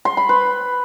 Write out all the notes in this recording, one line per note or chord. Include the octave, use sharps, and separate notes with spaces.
C6
B5
B4